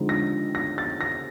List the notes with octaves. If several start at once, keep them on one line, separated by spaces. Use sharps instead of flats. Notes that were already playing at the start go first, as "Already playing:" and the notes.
Already playing: D3 F3 G#3 C4 D#4
A#6
A#6
A6
A#6